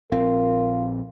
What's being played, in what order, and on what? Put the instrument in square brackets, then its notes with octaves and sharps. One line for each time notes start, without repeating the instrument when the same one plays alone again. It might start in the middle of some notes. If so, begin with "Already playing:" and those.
[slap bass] A#1 C4 [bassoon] F4 [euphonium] A#4